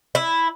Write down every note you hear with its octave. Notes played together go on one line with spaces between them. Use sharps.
E4